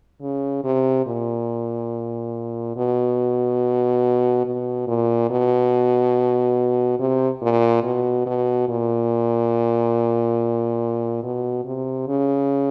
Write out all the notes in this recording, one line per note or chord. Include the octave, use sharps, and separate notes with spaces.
C#3
C3
A#2
B2
B2
A#2
B2
C3
A#2
B2
B2
A#2
B2
C3
C#3